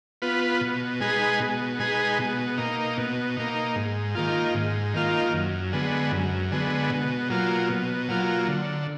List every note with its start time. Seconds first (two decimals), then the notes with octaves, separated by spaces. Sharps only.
0.22 B3 F4 B4
0.61 B2
1.00 G#3 D#4 G#4 B4
1.40 B2
1.79 G#3 D#4 G#4 B4
2.19 B2
2.58 A#3 D#4
2.97 B2
3.37 A#3 D#4
3.76 G#2
4.15 D#3 A#3 F4
4.55 G#2
4.94 D#3 A#3 F4
5.33 F#2
5.73 D3 G#3 B3
6.12 F#2
6.51 D3 G#3 B3
6.90 B2
7.30 F#3 A#3 F4
7.69 B2
8.09 F#3 A#3 F4
8.48 D3